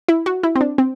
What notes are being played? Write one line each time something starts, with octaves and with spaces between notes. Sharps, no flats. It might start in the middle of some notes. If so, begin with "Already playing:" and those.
E4
F#4
E4
C4
D4
C4